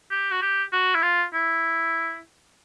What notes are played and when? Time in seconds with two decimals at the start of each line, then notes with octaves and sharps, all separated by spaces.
0.11 G4
0.31 F#4
0.42 G4
0.73 F#4
0.95 E4
1.03 F4
1.34 E4